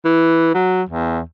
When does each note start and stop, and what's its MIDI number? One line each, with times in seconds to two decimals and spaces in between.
0.05 0.53 52
0.54 0.82 54
0.89 1.21 40